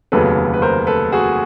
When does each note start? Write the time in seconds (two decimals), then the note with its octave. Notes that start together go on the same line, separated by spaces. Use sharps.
0.12 F1 D#2 C#3 F#3 B3 A4 B4
0.54 B4
0.62 A#4 C5
0.87 A4 B4
1.12 F#4 G#4